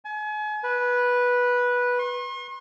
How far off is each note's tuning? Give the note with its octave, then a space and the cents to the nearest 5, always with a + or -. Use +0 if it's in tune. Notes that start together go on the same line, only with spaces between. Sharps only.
G#5 +35
B4 -10
C6 +45